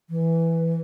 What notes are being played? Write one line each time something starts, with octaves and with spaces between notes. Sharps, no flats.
E3